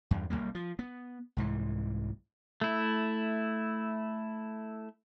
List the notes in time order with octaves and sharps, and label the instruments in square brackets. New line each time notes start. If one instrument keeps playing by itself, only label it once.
[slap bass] E2 G2
B1 E2 G3 A#3
F3
B3
C2 G#2 E3
[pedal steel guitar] A3 E4